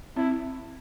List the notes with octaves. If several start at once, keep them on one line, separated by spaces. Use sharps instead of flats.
C4 E4